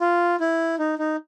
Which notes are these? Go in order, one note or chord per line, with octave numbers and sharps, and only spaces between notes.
F4
E4
D#4
D#4